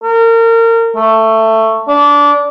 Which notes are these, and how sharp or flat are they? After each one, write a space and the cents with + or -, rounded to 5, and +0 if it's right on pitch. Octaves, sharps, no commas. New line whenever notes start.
A#4 -30
A3 +15
D4 -20